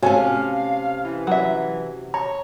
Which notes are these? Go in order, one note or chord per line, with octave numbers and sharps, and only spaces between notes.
C3 A3 C#4 F#4 C#5 F5 G#5
E3
F#3 E5
C#5 A#5